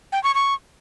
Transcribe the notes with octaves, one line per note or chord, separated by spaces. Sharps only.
G5
C#6
C#6